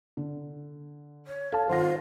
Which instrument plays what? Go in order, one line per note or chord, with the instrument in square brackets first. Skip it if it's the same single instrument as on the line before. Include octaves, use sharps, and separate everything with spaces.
[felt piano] D3
[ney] C#5
[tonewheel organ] A4 [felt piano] F5 A5
[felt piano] G#1 F#5 A#6 [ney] F4 [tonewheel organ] C5